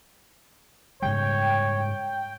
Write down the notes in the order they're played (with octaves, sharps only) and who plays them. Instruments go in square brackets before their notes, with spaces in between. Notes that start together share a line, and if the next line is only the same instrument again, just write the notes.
[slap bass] G#2 C#3 G3 [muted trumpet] C#5 [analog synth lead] G5